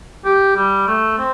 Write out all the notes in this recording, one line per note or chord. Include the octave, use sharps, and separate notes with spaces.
G4
G3
A3
C4